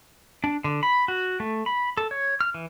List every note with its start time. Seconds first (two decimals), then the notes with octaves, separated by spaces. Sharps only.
0.44 D4
0.64 D3
0.83 B5
1.08 F#4
1.40 A3
1.66 B5
1.97 A4
2.11 C#5
2.41 F6
2.54 E3